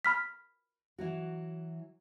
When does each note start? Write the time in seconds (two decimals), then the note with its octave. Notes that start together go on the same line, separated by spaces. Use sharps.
0.05 B5 F6 B6
0.98 E3 F#3 F#4